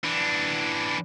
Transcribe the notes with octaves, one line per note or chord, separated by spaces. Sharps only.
E3 D4